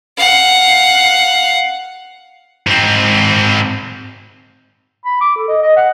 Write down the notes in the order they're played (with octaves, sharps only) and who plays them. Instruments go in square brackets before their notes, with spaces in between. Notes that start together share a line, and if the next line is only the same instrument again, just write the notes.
[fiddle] F5 F#5
[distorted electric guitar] G#2 C4
[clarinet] B5
D6
A4
D#5
D#5
F#5